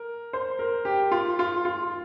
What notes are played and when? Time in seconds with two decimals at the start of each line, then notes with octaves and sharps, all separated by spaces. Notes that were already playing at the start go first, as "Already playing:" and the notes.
Already playing: A#4
0.33 C5
0.59 A#4
0.85 G4
1.11 F4
1.39 F4
1.65 F4